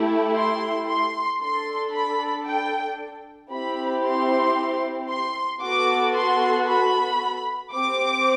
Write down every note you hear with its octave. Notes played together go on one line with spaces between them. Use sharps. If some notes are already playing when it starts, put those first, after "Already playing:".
Already playing: A3 E4 G4
C6
C6
D4 A4 C6
B5
G5
C4 E4 G4 B5
C6
C6
B3 F#4 A4 D6
C6
B5
C4 G4 D6